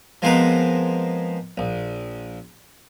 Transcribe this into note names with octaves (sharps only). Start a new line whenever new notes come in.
F3 G#3 B3 C4 A#4 B4
A#1